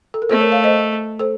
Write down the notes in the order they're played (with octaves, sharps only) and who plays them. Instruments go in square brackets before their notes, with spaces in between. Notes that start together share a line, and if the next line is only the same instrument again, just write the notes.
[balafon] A4
A#4
[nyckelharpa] A3 [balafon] A4 C5
[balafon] A#4 C#5
C#5 F5
C5 D#5
A4 C5